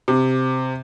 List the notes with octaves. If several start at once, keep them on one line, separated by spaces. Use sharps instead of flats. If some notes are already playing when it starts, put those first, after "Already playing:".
C3